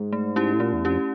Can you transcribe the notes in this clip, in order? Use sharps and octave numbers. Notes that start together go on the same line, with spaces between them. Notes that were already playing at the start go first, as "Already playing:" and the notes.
Already playing: G#2
A3
C#4 E4 G4
A2
A#2 A3
E2
F2 C#4 E4 G4